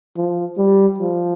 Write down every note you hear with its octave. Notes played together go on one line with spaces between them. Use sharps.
F3
G3
F3